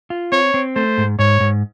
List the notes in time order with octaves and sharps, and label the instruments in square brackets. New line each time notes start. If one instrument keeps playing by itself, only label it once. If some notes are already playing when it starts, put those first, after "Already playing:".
[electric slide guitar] F4
[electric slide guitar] C4 [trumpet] C#5
[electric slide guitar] C4
[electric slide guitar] A3 [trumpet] C5
[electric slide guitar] G#2
[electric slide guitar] G#2 [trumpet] C#5
[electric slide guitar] G#2